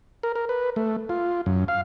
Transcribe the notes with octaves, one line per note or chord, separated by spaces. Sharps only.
A#4
A#4
B4
A3
F4
F#2
F5